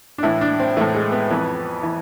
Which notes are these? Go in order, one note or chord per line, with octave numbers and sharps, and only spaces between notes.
D4
A2 E3 E4
D4
C4
A2 E3 A3
G#3
B3
F2 E3 B3
E3